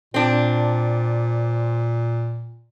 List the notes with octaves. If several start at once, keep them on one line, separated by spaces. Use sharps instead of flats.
A#2 C4 D4